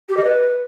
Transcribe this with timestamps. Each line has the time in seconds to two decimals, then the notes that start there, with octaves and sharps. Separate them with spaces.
0.09 G4
0.16 D#5
0.24 B4